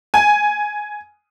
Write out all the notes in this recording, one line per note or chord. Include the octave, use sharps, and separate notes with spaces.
G#5